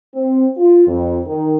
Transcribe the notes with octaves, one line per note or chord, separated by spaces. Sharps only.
C4
F4
F2
D#3